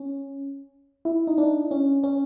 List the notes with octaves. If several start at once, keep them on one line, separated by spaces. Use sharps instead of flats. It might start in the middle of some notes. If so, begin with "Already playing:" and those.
Already playing: C#4
E4
D#4
D4
C#4
C#4